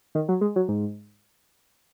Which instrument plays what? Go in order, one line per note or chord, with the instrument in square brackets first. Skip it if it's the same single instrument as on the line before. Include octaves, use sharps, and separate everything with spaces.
[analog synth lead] D#3
F#3
G#3
F#3
G#2